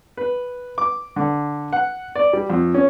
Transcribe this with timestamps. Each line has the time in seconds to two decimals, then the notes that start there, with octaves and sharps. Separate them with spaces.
0.17 B4
0.78 D6
1.16 D3
1.73 F#5
2.15 D5
2.33 G3
2.50 F2
2.75 C#4